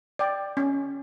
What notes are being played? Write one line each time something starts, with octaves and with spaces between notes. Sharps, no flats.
D5 G5
C#4